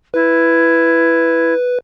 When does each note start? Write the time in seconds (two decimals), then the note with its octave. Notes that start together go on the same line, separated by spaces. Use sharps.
0.14 E4 B4